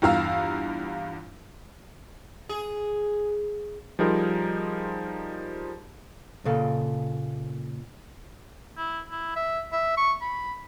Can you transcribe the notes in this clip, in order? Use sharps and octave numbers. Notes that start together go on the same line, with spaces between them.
E2 G2 F4 F5 A#5 E6
G#4
F3 G3 D#4 G#4 A#4 C5
A#2 C#3 A4 F5
E4
E4
E5
E5
C#6
B5